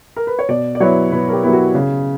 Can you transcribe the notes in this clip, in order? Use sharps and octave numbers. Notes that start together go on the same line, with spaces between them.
A#4
B4
C#5
B2 D5
D5
F#3 B3 E4 C#5
B2 B4
A#4
G4
F#3 B3 E4
F#4
C#3